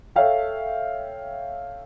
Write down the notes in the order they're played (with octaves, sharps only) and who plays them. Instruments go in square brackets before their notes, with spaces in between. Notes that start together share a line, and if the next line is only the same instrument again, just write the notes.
[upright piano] A4 C#5 E5 F5 G5